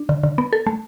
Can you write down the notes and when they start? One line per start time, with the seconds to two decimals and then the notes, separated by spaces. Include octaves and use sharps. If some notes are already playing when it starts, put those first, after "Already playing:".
Already playing: D4
0.09 D3
0.23 D3
0.38 B3
0.53 A4
0.67 A3